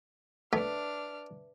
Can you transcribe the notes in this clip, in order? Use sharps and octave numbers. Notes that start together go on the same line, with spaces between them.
A3 D4 B4 E5 F6